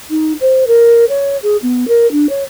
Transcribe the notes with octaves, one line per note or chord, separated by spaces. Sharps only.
D#4
C5
A#4
C#5
G#4
B3
A#4
D4
C#5